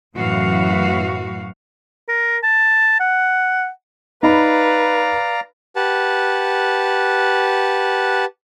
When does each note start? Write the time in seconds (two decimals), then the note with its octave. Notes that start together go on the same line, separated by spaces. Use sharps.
0.16 F#2 A2 E3 F#4 F5
2.09 A#4
2.44 A5
3.00 F#5
4.23 D#4 B4 D5 F5 A#5 B5
5.76 G4 B4 F#5 A5